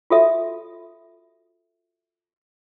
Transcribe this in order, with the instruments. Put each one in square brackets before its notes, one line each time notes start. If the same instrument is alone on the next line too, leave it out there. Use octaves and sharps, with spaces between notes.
[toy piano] F4 F#4 A4 E5